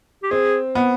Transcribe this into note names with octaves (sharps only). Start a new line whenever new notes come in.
G4
C4 G#4
B3